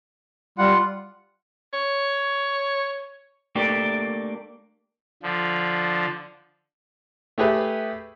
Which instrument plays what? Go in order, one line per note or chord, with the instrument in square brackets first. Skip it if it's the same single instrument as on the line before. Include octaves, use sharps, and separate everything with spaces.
[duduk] G3 [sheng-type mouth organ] F4 F#5
[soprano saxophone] C#5
[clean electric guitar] A3 A#3 D4 G4
[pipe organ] D3 F3
[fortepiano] A3 G4 G#4 B4 E5